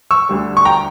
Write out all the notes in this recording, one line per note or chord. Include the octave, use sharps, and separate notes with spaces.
C#6 E6
D2 D3 G3
C#6
G5 A#5